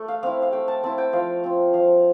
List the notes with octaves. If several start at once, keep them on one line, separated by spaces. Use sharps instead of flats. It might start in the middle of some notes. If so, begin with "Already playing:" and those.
Already playing: A3
F5
C4 E4 F5
F5
A3 G5
A5
C4 E4 A5
G5
F3 F5
C4 F4
F3 F5